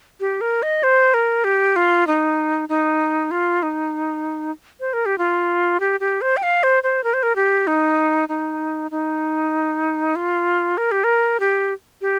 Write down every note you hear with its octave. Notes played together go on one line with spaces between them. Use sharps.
G4
A#4
D#5
C5
A#4
G4
F4
D#4
D#4
F4
D#4
C5
A#4
G4
F4
G4
G4
C5
G5
F5
C5
C5
A#4
C5
A#4
G4
D#4
D#4
D#4
F4
A#4
G4
A#4
G4
G4